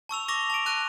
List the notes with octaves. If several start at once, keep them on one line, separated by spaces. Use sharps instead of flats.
A5 C#6 E6 F7
C#6 D6 E6 A#6 F7 G7
A5 D7
A5 C#6 F#6 D#7